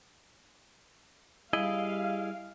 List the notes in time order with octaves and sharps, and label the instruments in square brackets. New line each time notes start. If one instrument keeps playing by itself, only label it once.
[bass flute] G3 [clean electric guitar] E4 G#4 D#5 [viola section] F5